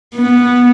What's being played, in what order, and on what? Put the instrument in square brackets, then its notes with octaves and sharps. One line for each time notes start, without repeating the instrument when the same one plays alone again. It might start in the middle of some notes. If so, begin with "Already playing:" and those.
[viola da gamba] B3